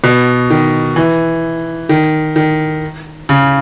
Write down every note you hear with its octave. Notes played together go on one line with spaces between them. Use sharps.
B2
D#3
E3
D#3
D#3
C#3